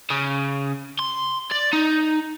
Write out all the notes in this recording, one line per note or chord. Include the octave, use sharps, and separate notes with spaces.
C#3
C6
D5
D#4